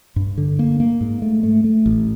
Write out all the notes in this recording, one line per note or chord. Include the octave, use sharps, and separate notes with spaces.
G2
D3
A#3
A#3
G#2
A3
A3
A3
A1